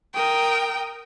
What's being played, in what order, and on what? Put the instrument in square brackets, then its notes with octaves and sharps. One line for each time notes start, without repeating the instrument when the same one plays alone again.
[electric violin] A#4 D#6 [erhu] G5